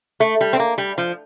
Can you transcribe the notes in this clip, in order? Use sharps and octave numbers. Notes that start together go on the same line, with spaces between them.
A3
G3
C4
A#3
G3
F3